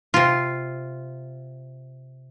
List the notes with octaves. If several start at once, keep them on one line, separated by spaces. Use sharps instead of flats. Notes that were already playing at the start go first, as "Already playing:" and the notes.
C3 F4